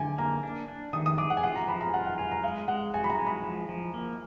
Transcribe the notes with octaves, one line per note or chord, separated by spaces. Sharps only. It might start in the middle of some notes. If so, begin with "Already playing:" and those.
Already playing: D3 G#5 D6
A#3 A#5
D4
D4
D#3 D#6
D#6
G#4 D6
F#5
G#5
F4 F#5
A#5
F3 B5
A#5
G#5
F4 F#5
F#5
F4 G#5
A#5
G#3 F5
G#3 F#5
F#4 G#5
B5
A#5
G#3
B5
F3
F3
A#3